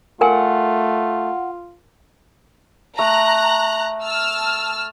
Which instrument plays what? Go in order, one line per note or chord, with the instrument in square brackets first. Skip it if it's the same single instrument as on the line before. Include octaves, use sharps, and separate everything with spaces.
[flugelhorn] A3 [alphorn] F4 [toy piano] A#4 G#5 [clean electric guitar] F#5
[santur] A3 [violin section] A#5 F#6
[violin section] A5 E6 F6